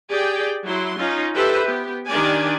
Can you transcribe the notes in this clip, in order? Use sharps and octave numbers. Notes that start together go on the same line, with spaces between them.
G4 G#4 D5 G5
F#3 E4 C6
C#4 D#4 F4
G4 A4 B4 C5 E5
B3 G4
D#3 D4 G4 D5 G#5